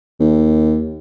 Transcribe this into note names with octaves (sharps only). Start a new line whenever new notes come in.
D#2